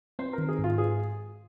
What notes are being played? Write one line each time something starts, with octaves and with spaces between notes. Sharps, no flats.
C4 C5
A#4
D#3
G#4
G#2
F4
G#4